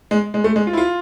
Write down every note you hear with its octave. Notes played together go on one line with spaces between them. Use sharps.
G#3
G#3
A3
G#3
F4
E4
F4